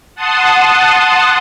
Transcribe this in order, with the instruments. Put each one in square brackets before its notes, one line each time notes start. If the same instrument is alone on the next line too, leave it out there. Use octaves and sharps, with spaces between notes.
[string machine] F#5 A5 C6 D#6